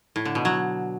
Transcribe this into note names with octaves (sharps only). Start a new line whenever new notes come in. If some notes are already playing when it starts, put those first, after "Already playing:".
A2
D3
B2
F#3